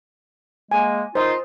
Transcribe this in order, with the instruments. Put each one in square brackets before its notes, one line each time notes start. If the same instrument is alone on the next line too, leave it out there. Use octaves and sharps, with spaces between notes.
[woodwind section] G#3 A#3 [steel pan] G#5
[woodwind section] D#3 D#4 F4 [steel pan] C5 D#5